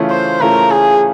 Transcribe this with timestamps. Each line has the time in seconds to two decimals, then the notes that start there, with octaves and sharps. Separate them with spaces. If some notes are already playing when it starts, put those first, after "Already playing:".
Already playing: C#3 E3 A3 C#4 F4
0.11 C5
0.41 C#3 E3 A3 C#4 F4 A#4
0.71 G#4